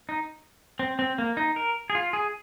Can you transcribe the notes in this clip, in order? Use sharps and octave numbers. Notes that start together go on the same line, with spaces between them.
D#4
C4
C4
A#3
D#4
A#4
G#4
F4
G#4